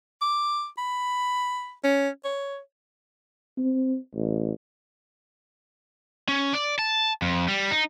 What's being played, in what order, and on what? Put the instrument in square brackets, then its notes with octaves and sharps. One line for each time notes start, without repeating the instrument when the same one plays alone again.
[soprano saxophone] D6
B5
C#4
C#5
[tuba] C4
A1
[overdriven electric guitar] C#4
D5
A5
F2
G3
D#4